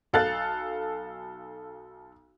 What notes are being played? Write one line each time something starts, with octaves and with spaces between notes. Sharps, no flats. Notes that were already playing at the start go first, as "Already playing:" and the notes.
B1 A4 F5 F#6 A6